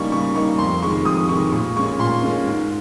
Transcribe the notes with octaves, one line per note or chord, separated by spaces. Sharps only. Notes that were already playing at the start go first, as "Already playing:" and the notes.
Already playing: C#3 G3 A#3 D#4 C#6
C#3 C#6
G3 A#3 D#4 C#6
F2 C6
C3 D#3 G#3 C#6
F2 D#6
C3 D#3 G#3 C#6
A#2 C#6
G#3 C#4 C#6
A#2 C6
G#3 C#4
G#2